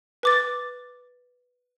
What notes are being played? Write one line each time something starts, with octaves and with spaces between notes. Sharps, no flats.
B4 D6 A6